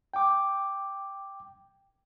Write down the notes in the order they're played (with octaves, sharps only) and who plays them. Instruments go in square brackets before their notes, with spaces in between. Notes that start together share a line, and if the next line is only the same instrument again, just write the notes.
[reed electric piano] G5 D6